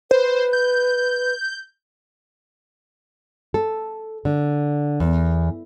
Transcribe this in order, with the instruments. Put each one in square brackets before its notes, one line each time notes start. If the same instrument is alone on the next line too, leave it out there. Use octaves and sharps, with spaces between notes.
[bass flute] B4 [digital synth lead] C5
[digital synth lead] G6
[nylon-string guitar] A4
D3
E2